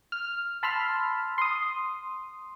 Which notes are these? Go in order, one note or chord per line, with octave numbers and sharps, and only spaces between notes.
F6
A5 B5 C6 E6 F6
C6 D#6